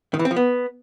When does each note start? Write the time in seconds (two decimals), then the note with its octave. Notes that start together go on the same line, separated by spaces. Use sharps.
0.14 D#3
0.19 E3
0.25 C4
0.31 F3
0.36 B3